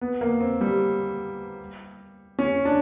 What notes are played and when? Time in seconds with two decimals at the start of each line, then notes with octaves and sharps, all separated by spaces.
0.01 B3
0.21 A#3
0.41 C4
0.61 G3
2.39 C#4
2.65 D4